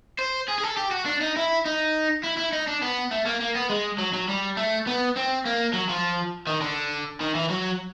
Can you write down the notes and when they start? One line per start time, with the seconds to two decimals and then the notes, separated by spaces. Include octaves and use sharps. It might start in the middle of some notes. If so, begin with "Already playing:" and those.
0.19 C5
0.48 G#4
0.58 G#4
0.64 A4
0.77 G4
0.92 F#4
1.06 D4
1.21 D#4
1.37 E4
1.66 D#4
2.24 E4
2.38 E4
2.53 D#4
2.68 D4
2.82 B3
3.11 A3
3.26 A#3
3.41 A#3
3.55 B3
3.70 G#3
3.98 F#3
4.13 F#3
4.28 G3
4.57 A3
4.87 B3
5.16 C4
5.45 A#3
5.74 F#3
5.89 F3
6.47 D#3
6.61 D3
7.21 D#3
7.35 E3
7.50 F#3